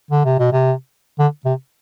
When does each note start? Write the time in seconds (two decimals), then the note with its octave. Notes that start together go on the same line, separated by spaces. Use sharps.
0.11 D3
0.25 C3
0.39 B2
0.52 C3
1.19 D3
1.45 C3